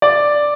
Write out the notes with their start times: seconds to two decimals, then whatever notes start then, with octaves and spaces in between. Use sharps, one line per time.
0.02 D5